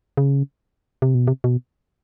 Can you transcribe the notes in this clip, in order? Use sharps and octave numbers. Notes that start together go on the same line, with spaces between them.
C#3
C3
B2
C3
B2